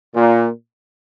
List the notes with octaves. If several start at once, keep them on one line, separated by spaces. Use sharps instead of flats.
A#2